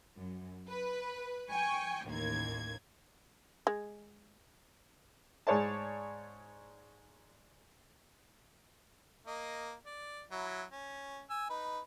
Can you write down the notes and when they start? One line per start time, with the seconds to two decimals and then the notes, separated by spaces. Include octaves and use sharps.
0.18 F#2
0.68 B4
1.50 G5 G#5 C#6
2.06 A1 D#2 A#3 G#6
3.67 G#3
5.47 G#2 G#4 C#5 D5 A5
9.27 A#3 D#5
9.86 D5
10.31 F#3 E4
10.72 C#4
11.30 G#5 E6
11.50 D#4 B4